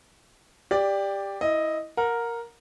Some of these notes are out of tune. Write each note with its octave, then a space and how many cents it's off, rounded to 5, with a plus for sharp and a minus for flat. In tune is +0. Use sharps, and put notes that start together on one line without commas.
G4 +15 D5 +0
E4 -15 D#5 +0
A#4 +0 F#5 -30